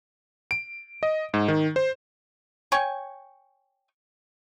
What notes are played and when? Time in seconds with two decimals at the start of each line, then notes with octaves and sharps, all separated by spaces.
0.51 D7
1.03 D#5
1.34 G#2
1.48 D#3
1.76 C5
2.72 C#5 G5 G#5 C#6